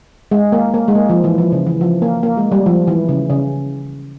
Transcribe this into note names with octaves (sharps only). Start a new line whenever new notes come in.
G#3
A#3
A#3
G#3
A#3
F3
E3
F3
C#3
E3
F3
A#3
A#3
G#3
G3
F3
E3
C#3
C#3